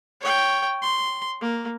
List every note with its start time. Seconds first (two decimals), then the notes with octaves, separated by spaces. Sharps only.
0.21 C#5 G5
0.82 C6
1.41 A#3